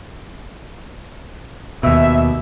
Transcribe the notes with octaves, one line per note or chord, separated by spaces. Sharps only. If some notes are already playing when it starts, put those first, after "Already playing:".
D#2 B2 E5